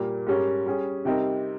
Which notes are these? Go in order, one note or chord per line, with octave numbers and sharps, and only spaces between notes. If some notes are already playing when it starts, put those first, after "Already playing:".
Already playing: A#2 G3 A#3
G#2 G3 C#4 G4 A#4
G3 C#4 G#4
C3 G3 C4 D#4 A#4